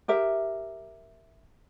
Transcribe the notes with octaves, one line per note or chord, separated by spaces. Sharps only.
G4 A#4 E5